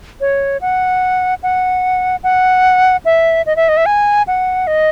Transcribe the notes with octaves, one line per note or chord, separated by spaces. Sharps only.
C#5
F#5
F#5
F#5
E5
D#5
E5
D#5
E5
G#5
F#5
D#5